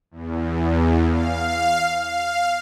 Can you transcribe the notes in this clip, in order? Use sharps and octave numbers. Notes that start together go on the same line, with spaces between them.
E2
F5
F5